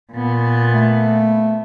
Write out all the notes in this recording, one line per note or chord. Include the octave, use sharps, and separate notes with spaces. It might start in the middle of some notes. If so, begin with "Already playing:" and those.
A#2 B3
A3